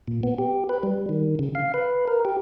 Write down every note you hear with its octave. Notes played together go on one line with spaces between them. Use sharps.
A#2
B3
G4
B4
G3
D#3
C#3
F5
B4
A#4
G4